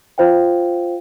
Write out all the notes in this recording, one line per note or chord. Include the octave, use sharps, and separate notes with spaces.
F4 C5 F5 G5